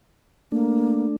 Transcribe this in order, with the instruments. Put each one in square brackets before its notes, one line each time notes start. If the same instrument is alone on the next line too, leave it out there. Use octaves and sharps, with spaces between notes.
[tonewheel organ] A3 D4 [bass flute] A#3